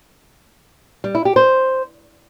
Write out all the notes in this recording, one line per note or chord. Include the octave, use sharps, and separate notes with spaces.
G3
E4
G4
C5